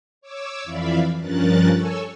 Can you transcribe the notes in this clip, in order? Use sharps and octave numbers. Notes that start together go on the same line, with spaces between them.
C#5 D6 E6
F2 E3 D5 E5 F5 B5
G2 F3 C#4 A#4 F#6 A6
A4 C#5 G#5 C#6 E6